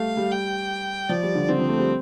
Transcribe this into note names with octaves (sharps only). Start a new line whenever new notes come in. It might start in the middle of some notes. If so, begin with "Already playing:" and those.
Already playing: G3 A3 F5
G3
G5
F3 D5
G3
D3
D3 C4
F3
A3
G3